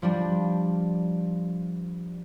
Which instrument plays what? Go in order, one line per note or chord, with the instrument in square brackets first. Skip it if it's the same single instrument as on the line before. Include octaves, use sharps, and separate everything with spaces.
[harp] F3 G3 D4